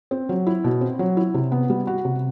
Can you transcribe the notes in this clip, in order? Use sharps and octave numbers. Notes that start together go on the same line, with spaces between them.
C4
F#3
E4
B2
C4
F#3
E4
C3
B3
G3
F#4
C3